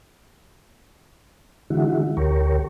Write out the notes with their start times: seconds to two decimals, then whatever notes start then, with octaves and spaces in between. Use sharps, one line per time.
1.70 D3 E3 G#3 E4 F#4
2.17 D2 G4 A#4 C#5